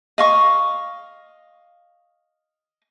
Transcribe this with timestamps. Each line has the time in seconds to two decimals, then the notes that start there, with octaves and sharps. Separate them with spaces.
0.18 D#5 F5 C#6